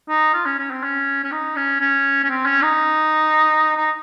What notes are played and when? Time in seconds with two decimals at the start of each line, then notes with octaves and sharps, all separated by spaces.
0.09 D#4
0.34 F4
0.45 C#4
0.59 C#4
0.70 C4
0.83 C#4
1.24 C#4
1.32 D#4
1.56 C#4
1.80 C#4
2.24 C#4
2.29 C4
2.46 C#4
2.62 D#4
3.77 D#4